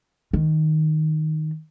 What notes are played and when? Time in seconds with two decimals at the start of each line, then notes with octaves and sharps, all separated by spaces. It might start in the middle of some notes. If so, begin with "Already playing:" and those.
0.33 D#3